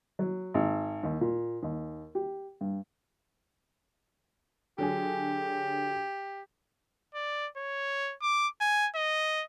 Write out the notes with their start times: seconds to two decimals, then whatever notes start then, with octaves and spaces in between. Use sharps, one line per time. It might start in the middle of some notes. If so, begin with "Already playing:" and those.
0.19 F#3
0.54 G#1
1.03 D#2
1.21 A#2
1.63 D#2
2.15 G4
2.61 G2
4.78 D3 F#3 G4 G#4
7.15 D5
7.57 C#5
8.22 D6
8.61 G#5
8.95 D#5